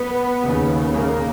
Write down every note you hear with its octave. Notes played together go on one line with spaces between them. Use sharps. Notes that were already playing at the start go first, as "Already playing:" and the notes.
Already playing: B3
D#2 C#3
A#3